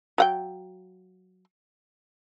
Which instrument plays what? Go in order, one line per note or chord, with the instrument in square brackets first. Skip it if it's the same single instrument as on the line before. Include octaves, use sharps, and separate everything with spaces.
[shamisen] F#3 F#5 G5